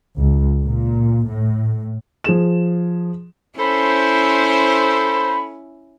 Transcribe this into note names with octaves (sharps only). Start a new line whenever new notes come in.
C#2
A#2
A2
F3 G#4 E7
C#4 E4 A4 C5 B5